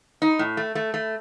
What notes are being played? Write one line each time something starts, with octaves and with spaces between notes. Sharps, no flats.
D#4
A2
A3
A3
A3